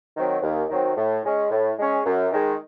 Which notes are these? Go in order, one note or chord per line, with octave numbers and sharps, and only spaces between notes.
D#3 F#3 C4
D#2
D#3 F#3 C4
A2
G#3 C#4
A2
G#3 C#4
F#2
D#3 G#3